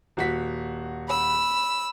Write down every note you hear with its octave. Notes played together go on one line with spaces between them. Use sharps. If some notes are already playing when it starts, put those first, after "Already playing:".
D#1 F#4 B6
B5 E6